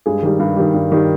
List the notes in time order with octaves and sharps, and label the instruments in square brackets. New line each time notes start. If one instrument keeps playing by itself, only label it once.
[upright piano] G2 G#3 G#4
D#3 G3
G2
D#3 G3
G2
D#3 G3